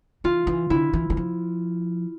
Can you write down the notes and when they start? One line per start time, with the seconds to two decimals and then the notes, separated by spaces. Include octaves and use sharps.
0.24 E3 F4
0.47 E3
0.70 D3 E4
0.93 E3
1.10 E3
1.17 F3